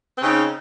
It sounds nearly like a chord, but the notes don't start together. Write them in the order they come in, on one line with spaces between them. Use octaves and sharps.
C4 C#3 D#4